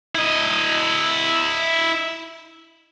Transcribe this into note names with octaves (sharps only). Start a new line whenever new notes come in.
E4 D#5